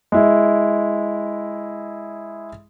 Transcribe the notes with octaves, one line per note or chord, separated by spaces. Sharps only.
G#3 E4